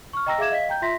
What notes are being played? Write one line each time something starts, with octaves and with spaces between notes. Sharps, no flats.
C#6 F6
D#5 G5 A#5 E6 A#6
G#4 E5 F5 D6 G#6 E7
D#5 F5 B6
G5 A#5 G6
F4 E5 C6 A#6 B6